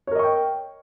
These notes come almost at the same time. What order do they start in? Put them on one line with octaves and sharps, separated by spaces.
C#5 A#4 D#5 C#6 G5